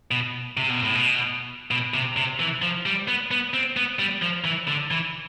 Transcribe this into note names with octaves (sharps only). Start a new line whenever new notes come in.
B2
C3
B2
A2
B2
B2
C3
C3
E3
F3
G3
B3
B3
C4
B3
G3
F3
E3
D3
E3